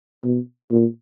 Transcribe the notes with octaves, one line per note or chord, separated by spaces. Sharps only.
B2
A#2